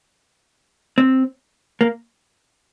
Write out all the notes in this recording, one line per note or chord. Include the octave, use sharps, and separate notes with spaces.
C4
A#3